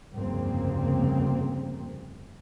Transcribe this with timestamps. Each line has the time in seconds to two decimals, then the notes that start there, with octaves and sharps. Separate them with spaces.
0.13 F1 D2 G2 C#3 A#3 C4